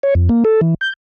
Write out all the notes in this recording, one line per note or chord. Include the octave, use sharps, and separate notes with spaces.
C#5
F2
A#3
A4
E3
G6